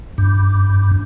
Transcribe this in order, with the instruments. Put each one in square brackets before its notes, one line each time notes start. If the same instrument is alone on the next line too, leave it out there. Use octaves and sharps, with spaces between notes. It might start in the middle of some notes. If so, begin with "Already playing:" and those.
[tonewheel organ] G2